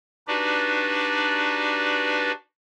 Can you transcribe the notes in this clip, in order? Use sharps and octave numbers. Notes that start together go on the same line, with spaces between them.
D4 D#4 F#4 G4 B4 D5